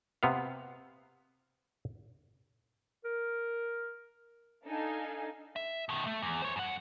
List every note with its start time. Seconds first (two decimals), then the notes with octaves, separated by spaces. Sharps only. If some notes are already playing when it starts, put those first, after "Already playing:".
0.23 C3 B3 F5
3.05 A#4
4.66 D4 D#4 A4 F5 G#5
5.56 E5
5.89 B2 D#3
6.07 A3
6.22 E2
6.42 C5 C#5
6.56 F#2 F#5